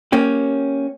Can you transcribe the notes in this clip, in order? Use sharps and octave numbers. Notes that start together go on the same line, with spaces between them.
A#3 C#4 G4